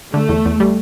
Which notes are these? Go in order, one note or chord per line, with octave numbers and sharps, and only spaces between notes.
D3 A3
E2
E2
G3